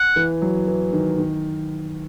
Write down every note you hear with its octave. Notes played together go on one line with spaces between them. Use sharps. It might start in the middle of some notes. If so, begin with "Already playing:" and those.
Already playing: F#5
E3
F#3
E3
D#3
D#3